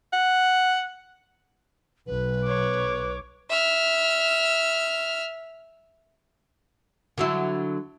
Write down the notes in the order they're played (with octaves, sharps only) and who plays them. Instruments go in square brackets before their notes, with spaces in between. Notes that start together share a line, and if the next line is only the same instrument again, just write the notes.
[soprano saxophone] F#5
[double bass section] B1 [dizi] B4
[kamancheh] C#5 D6
[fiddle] E5 F6
[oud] D3 F#3 E4